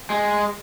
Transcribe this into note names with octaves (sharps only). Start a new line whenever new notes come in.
G#3